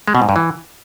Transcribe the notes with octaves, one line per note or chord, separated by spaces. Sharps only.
G#3
B2
G#2
G2
E3